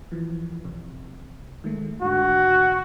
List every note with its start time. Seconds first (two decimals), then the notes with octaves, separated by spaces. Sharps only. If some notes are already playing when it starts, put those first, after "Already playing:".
0.12 E3 F3
0.65 A#1 C3
1.64 D#3 G#3 A3
2.02 G#2 D3 F#4